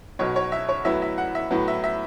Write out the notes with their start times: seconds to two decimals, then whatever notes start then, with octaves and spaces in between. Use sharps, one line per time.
0.19 B1 B2 F#3 C#5
0.36 C#5
0.52 E5
0.69 C#5
0.85 A2 F#3 B3 E4 E5
1.02 E5
1.18 F#5
1.35 E5
1.51 A2 F#3 B3
1.68 E5
1.84 E5